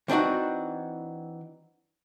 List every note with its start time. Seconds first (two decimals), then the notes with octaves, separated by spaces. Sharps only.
0.08 E3 C4 D4 D#4 F#4